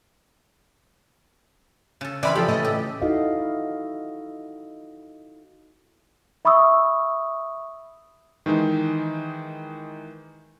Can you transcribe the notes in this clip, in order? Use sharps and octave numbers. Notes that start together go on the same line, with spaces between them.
C#3 A4
C#3 E3 C4 D5 E5 B5 F6
F3 G4 A4 B5
A2 D#5
G4
D#4 E4 F#4 A4 D#5 F5
E5 B5 C#6 D#6 E6
D#3 E3 G#3 D#4